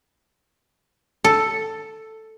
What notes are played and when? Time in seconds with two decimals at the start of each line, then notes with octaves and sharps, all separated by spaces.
1.24 A4